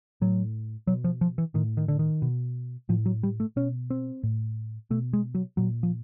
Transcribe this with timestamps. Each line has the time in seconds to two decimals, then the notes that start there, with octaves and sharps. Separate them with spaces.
0.21 A2 F#3
0.87 B2 F#3
1.04 F3
1.21 F3
1.38 E3
1.54 A2 D#3
1.77 D#3
1.88 D3
1.99 D#3
2.22 B2
2.89 A2 F3
3.06 F#3
3.23 G3
3.40 A3
3.56 B2 C#4
3.90 C4
4.23 A2
4.90 B2 A3
5.13 G#3
5.35 F#3
5.57 A#2 F#3
5.83 F3